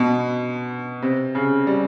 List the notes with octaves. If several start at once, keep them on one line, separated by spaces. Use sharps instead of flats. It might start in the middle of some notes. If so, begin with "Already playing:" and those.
Already playing: B2
C3
C#3
G3